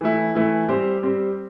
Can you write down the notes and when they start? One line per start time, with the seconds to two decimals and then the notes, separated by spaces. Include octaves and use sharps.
0.01 E3 A3 E4
0.35 E3 A3 E4
0.69 G3 C4 G4 C5
1.02 G3 C4 G4 C5